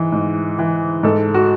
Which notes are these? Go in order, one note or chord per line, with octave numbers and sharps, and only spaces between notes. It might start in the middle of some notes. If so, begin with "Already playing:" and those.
Already playing: G#2 E3
G#2
E3
G#2 A4
F#4